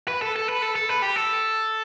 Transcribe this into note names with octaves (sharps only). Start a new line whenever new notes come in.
B4
A4
A4
B4
A4
A4
B4
G4
A4